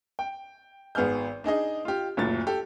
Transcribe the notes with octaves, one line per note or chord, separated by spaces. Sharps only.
G5
G#1 B3 G#4 F6 G6
D4 D#4 G#4 D#5
F4 G4
F#1 D2 A#2 A6
G4 A4